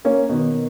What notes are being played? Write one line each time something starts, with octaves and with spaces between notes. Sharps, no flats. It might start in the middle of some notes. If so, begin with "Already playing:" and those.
A#3 C#4
B2 D#3